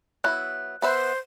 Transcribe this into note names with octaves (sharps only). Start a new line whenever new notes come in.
F#3 B3 E4 F#6
B3 B4 C5 E5